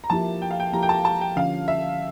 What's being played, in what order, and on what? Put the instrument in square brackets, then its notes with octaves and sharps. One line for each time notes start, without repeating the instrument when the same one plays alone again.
[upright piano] A#5
[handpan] F3 A#3 E4 G4 [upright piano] A5
[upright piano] G5
F5
G5
[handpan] F3 A#3 E4 G4 [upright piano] A#5
[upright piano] G5
A5
A5
G5
[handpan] D3 F3 C#4 F4 [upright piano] F5
[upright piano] E5